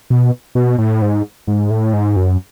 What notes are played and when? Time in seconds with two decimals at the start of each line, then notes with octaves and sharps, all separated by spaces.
0.10 B2
0.55 B2
0.78 A2
1.02 G#2
1.47 G#2
1.70 A2
1.93 G#2
2.16 F#2